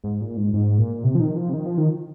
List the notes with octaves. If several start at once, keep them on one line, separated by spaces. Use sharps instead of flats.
G#2
A#2
G#2
G#2
A#2
C3
F3
D#3
F3
C3
D#3
F3
D#3